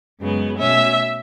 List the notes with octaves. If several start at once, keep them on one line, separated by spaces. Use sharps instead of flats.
F#2 C#3 G#3 B3
B2 A3 C#4 E5